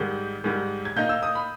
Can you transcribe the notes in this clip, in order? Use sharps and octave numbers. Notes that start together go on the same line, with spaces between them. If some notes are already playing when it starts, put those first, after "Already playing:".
Already playing: G#2 D#3 G3 G6
G#2 D#3 G3
G#6
A#2 A#3 D#4 G6
E6
D#6
B5